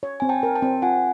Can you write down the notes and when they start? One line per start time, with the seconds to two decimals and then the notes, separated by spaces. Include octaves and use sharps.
0.03 C#5
0.20 C4 G#5
0.29 G5 A5
0.43 A#4
0.55 G5 A5
0.62 C4
0.82 F4 F#5 G#5